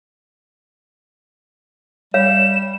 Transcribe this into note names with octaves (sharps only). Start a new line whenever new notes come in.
G3 C#5 F5 E7